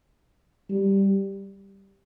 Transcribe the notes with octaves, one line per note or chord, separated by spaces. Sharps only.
G3